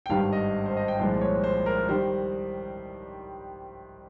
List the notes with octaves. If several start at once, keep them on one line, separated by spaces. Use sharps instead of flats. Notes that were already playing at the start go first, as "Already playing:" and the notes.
G5
G#1 G2 D#3 G3 F5
D#5
C5
D#5
G5
C2 A#2 F3 G#3 C5
C#5
C5
A#4
D#3 G3 C5